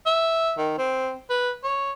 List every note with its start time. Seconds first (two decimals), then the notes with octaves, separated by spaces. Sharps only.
0.06 E5
0.58 D#3
0.78 C4
1.30 B4
1.64 C#5